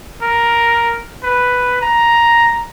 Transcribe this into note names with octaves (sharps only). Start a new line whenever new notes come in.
A#4
B4
A#5